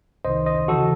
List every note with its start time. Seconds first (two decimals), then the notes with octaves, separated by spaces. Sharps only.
0.25 C2 C3 D#3 C5 D#5
0.46 C5 D#5
0.68 D#2 C#3 E3 F#4 A4